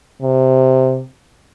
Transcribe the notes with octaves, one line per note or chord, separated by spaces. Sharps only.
C3